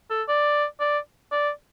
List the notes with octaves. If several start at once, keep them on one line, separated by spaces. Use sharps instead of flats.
A4
D5
D5
D5